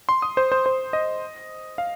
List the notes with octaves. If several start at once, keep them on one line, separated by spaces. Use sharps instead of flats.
C6
D#6
C5
C5
C5
D#5
F5